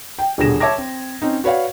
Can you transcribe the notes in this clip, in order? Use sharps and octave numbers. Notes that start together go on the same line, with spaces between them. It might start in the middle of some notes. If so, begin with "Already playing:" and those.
G5
D#1 B2 D3 G#4 A#6 E7
C#5 E5 A5 D6 G#6 A#6
C4
C4 C#4 D#4
F#4 B4 C#5 D5 F5 F#5